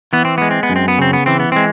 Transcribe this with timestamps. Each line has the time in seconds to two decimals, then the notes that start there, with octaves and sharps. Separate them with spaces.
0.13 E3 B3
0.25 C4
0.38 G#3 B3
0.51 C4
0.63 B3
0.70 F#2
0.76 C4
0.88 B3
0.99 C#3 C4
1.13 B3
1.26 E3 C4
1.40 B3
1.52 G#3 C4